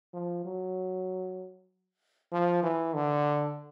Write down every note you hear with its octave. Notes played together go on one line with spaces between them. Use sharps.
F3
F#3
F3
E3
D3